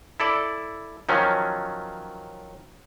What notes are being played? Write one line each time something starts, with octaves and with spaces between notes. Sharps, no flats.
E4 A4 D5
D#3 F3 F#3 C#4